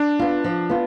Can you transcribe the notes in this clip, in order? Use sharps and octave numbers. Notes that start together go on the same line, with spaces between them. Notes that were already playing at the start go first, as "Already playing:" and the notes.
Already playing: D4
B3 F4
F3
B3 F4